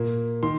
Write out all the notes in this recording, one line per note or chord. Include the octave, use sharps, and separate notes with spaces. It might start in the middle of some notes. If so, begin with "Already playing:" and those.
Already playing: A#2 A#3
D#3 C6